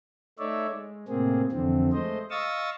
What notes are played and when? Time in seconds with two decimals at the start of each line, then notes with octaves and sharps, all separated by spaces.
0.39 A3 D#4 C#5 D5 E5
0.70 G#3
1.08 A2 C3 A#3 C4 G#4
1.52 F2 D3 E3 C4
1.93 G#3 A3 C5 D#5
2.30 D#5 F5 C#6 D#6 E6 A6